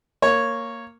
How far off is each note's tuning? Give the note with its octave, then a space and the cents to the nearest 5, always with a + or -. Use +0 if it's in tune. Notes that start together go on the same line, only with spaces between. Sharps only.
A#3 -10 C#5 -5